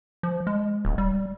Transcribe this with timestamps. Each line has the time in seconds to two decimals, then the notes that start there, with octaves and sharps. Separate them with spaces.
0.23 F3
0.47 G#3
0.85 D1
0.98 G3